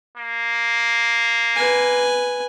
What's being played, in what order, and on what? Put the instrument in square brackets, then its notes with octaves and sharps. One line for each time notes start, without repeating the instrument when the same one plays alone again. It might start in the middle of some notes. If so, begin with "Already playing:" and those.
[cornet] A#3
[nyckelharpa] B4 G#5